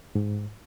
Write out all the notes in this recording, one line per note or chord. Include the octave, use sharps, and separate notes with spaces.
G#2